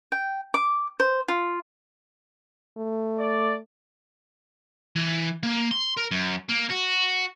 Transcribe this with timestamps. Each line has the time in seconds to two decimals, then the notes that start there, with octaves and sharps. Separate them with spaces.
0.12 G5
0.54 D6
1.00 C5
1.28 F4
2.77 A3
3.19 D5
4.96 E3
5.43 A#3
5.71 C6
5.97 A#4
6.11 F#2
6.49 A#3
6.71 F#4